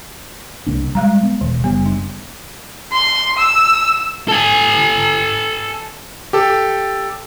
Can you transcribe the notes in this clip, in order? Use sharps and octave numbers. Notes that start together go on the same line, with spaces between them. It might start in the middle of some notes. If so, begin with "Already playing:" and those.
C2 A#3 D4
G3 G#3 F5 A#5
B3
E1 D#3
F#1 G3 B3
D4
C6
E6
A4 G#5
G4 A4